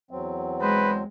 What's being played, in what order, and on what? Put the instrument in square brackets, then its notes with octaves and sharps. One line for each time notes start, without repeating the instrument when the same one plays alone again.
[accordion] E2 F#3 C4
[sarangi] G#3 [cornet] B4 [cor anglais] C5